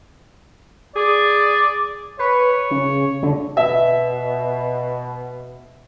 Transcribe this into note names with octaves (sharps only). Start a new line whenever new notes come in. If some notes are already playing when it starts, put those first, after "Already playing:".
G#4 D5
B4 C#5
C#3
D3
B2 E5